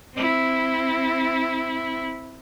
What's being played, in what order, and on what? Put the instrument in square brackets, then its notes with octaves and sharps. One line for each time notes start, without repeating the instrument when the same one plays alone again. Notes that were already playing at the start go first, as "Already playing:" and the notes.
[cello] C4 E4